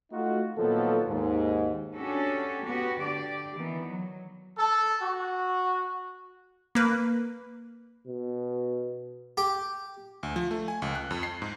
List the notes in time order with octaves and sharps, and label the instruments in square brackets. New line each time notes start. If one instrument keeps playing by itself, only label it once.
[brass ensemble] A3 D#4 F4 F#4
A#2 D#3 F3 F#3 B3 A4
D#2 G#2
[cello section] C#4 D4 F#4 G4 A4
B3 F#4 G4
D3 G4 D5
D#3 E3 B3
F#3
[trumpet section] A4
F#4
[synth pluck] A#3 B4
[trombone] B2
[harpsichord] G4
[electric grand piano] D2
F3
A3
G#5
C#2
F#6
F2
C7
G#2